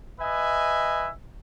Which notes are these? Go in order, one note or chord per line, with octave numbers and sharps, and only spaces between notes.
B4 D#5 E5 G#5